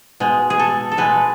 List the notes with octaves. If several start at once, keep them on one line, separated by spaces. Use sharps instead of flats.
B2 G#3
G#4
A4
A4
B2 G#3 B4